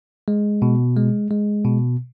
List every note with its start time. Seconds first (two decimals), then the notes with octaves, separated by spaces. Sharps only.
0.28 G#3
0.62 B2
0.96 G#3
1.31 G#3
1.65 B2